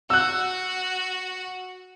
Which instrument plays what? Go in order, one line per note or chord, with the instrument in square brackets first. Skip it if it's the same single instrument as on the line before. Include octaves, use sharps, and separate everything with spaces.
[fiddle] F#4 [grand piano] E6 F#6